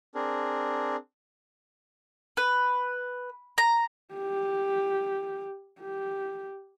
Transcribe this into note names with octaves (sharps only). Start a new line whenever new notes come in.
C4 D4 G#4 A#4
B4
A#5
G4
G4